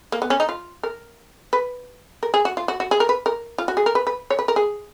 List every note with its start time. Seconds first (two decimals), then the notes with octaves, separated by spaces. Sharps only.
0.12 A#3
0.22 B3
0.30 C#4
0.40 D#4
0.49 F4
0.83 A#4
1.53 B4
2.23 A#4
2.34 G#4
2.45 F#4
2.57 F4
2.68 F#4
2.80 F#4
2.91 G#4
3.00 A#4
3.09 B4
3.26 A#4
3.58 F4
3.68 F#4
3.77 G#4
3.86 A#4
3.95 B4
4.07 B4
4.30 C#5
4.39 B4
4.48 A#4
4.56 G#4